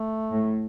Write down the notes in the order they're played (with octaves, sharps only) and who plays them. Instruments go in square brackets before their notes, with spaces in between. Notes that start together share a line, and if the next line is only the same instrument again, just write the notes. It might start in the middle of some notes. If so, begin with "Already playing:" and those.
Already playing: [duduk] A3
[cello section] A2